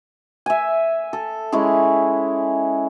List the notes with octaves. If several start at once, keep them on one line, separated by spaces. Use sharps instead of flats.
E5 G#5
A4
G#3 C#4 E4 G#4